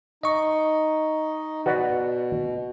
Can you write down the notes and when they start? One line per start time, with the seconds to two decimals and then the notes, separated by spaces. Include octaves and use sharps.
0.23 D#4 D#5 C#6
1.66 B2 F#4 B4 D5